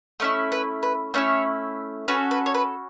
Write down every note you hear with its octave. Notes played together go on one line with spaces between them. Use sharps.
A3 C#4 E4 D#5
B4
B4
A3 C#4 E4 C#5
C#4 F#4 A4 B4
B4
C#5
B4